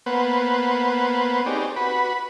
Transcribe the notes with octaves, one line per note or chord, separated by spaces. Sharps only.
A#3 B3 B4 C5 F#5
C4 D#4 G4 G#4 C#5 D5
F#4 B4 B5